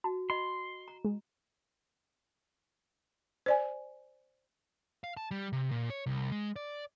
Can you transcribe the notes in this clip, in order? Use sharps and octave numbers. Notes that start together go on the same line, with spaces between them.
F#4 A5
D#5 B5 C6
A#5
G#3
C5 D5 G#5
F5
A5
G3
C3
A#2
C#5
C2
G#3
D5